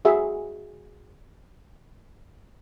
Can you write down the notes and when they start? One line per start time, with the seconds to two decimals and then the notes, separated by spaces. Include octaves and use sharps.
0.05 F#4 G#4 E5